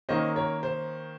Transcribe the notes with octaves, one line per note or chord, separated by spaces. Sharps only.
D#3 A#3 C#4 C5 D#5
A#4 C#5
C5